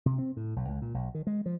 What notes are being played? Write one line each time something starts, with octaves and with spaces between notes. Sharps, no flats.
C3
C4
A2
B1
C#2
A#2
B1
D#3
G#3
F3